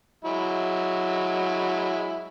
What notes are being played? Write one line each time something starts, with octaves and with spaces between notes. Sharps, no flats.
F#3 G#3 E4